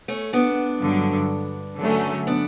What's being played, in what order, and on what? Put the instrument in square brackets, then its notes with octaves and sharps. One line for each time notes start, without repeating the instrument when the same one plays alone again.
[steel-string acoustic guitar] A3 C#4
B3 D4
[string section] G2 D3 F#3
D3 F#3 A3 C#4
[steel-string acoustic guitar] B3 D4